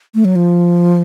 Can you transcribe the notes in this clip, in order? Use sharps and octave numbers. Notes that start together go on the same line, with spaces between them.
A3
F#3
F3